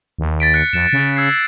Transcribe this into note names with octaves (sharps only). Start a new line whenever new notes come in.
D#2
A6 B6 D7
F#6 C#7
F2 E7
C#3
E6 G#6 C7